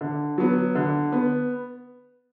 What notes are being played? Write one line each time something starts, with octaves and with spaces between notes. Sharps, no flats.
D3
F#3 B3
D3
B3